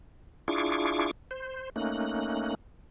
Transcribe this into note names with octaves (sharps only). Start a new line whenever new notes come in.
D4 E4 F4 G#4 C#6 D6
C5
A3 A#3 C#4 D#4 F#6